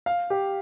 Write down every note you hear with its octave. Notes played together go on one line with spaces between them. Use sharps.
F5
G4